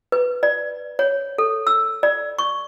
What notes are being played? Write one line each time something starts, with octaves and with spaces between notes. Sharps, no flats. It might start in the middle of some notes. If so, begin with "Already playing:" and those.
B4
D5
C#5
A4
E6
D5
C#6